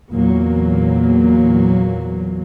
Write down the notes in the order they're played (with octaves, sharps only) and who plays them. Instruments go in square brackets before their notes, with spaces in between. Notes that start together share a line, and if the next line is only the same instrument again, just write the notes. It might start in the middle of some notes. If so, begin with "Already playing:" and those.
[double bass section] E2 A#2 F#3 A#3